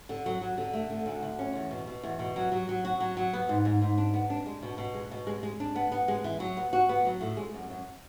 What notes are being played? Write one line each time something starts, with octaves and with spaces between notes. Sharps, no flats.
D3
F#3
F#3
D3
A3
D3
D2
D2
C#4
E2
B2
B2
E2
B2
F#3
F#3
F#3
F#4
F#3
F#3
B3
G#2
G#2
G#2
D4
B3
D4
G#3
B2
B2
G#3
B2
G#3
G#3
D4
B3
B3
G#3
E3
F#3
B3
F#4
B3
F#3
A2
G#3
F#2
F#2